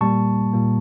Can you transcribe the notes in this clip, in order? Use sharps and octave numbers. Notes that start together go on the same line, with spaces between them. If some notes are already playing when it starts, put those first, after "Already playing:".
A#2 G3 A#3 A5 C#6
A#2 G3 A#3